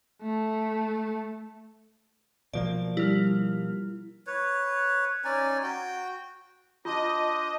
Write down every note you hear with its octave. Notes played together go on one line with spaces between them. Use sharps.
A3
B2 F3 A#3 D5
G3 E4 F6
B4 C#5
C#4 D#4 D5 G#5
F#4 G5
D4 F4 C5 D#5